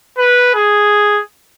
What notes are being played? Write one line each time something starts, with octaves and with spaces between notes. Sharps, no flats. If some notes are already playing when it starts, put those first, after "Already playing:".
B4
G#4